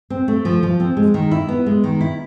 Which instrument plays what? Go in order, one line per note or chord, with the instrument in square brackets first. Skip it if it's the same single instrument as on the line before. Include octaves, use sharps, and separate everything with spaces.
[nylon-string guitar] C4
A3
F3
F3
C4
G#3
D#3
E4
B3
G#3
D#3
E4